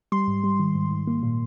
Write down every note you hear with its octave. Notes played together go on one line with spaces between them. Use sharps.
G3 C6
G#2
G3
D#3
G#2
G#2
A#3
A#2